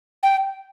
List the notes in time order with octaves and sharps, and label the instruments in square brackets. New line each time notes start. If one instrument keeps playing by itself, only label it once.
[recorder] G5